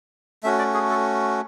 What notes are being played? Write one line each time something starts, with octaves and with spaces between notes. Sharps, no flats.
A3 C#4 F#4 E5
D5
G#4
A4